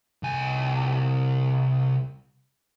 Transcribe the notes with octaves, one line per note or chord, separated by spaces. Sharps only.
C2 G#5